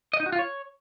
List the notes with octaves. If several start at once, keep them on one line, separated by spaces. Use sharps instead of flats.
D#5
D#4
F#4
F4
C#5